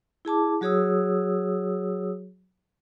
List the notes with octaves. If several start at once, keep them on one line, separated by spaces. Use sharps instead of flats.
E4 G#4 A5 D6
F#3 F#4 G#4 C#5 D#6 E6